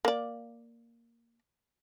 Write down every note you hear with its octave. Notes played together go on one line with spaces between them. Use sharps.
A#3 D5